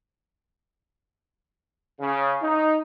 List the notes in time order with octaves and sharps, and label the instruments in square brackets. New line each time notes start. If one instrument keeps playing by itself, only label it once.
[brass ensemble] C#3
D#4